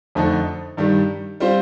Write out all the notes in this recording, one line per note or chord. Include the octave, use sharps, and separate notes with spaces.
F2 D3 A3 D#4 A4
G2 D#3 G3
G3 C4 F4 C5